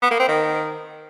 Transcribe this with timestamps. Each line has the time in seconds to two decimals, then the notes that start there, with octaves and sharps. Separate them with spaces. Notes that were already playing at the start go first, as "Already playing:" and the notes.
0.02 B3
0.11 A#3
0.20 C4
0.28 D#3